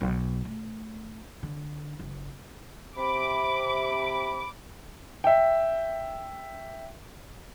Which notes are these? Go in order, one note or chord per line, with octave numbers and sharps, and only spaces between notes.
B1
A3
D3
F#1
C3 B5 D6
E5 G5